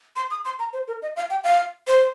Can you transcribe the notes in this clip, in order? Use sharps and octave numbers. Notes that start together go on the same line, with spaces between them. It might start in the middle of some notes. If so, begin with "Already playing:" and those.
C6
D#6
C6
A#5
C5
A#4
D#5
F5
G5
F5
C5